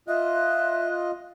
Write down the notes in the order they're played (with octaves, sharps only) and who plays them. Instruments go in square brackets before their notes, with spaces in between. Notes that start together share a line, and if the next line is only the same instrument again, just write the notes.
[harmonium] F4 D#5 [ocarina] E5 [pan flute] F#6